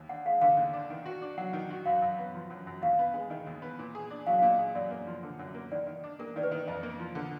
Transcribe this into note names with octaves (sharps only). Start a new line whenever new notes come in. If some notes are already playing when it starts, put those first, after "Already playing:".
Already playing: D#2
D4 F#5
G#3 F5
D3 F5
D#2
D4
D#3
F#4
D4
F#3 F#5
D#3
F#4
F#2 F5
F#2
B3
F3
F#2
F#2
D#2 F5
B3
G#3
D#3 D#5
D#2
B3
A#2
G#4
D4
F#3 F5
A#2 F5
D#5
G#4
F#2 D5
A#3
F3
D3
F#2
A#3
D#3 D5
D#3
D4
A#3 A#4
D#3 D5
B4
D#3
F2 D#5
A#3
F3
D3